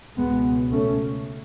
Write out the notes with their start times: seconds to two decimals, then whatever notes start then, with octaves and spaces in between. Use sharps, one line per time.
0.17 C#2 B2 G#3 B3
0.71 A3 C#4